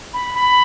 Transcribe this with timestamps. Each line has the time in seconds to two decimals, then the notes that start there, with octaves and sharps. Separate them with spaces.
0.14 B5
0.34 B5